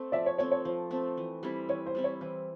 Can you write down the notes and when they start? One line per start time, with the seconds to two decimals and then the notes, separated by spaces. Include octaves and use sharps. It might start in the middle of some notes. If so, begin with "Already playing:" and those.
Already playing: A3 C4
0.12 F3 D5 E5
0.26 C#5
0.38 A3 C4 C#5
0.52 C#5
0.65 F3 C5
0.91 A3 C4
1.17 E3
1.43 G3 C4 E4
1.69 E3 C#5
1.86 C5
1.95 G3 C4 E4
2.04 C#5
2.21 E3 C5